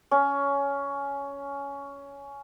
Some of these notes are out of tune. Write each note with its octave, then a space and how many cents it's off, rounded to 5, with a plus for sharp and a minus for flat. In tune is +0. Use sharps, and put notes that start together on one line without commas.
C#4 +15